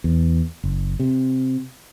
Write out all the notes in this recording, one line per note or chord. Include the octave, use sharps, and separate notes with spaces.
E2
F#1
C3